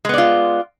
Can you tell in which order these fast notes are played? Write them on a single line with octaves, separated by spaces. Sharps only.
G#3 B3 D5 F4